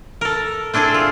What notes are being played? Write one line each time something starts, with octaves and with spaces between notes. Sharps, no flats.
A4 A#4
C4 D4 E4 G#4 A4
F4